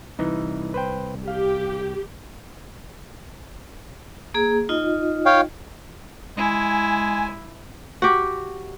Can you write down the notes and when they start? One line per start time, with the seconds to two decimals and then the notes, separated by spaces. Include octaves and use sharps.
0.19 C2 E3 D#4
0.74 B4 C5 G5
1.28 G4 F5
4.34 A#3 G#4
4.69 D#4 F4 D#5
5.26 C#5 F5 G5
6.37 G#3 E4 G#5
8.02 F#4 G4